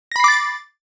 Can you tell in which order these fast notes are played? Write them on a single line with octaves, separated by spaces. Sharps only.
A#6 B5 C7 D6 A6